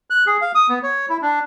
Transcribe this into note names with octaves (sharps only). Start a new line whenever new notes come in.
F#6
G#4
F5
D#6
B3
C#5
E4
D4